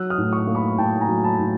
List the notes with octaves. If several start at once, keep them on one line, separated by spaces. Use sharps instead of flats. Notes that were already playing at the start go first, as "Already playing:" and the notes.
Already playing: F#3 E6 F#6
D#6 F6
A2
C#6 D#6
A#3
B5 C#6
A2 G5 A5
G#5 A#5
F#3
A5 B5
A2